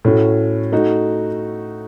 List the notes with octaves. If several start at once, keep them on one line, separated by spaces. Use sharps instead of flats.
A2 A3 C#4 F#4
A3 D#4 F#4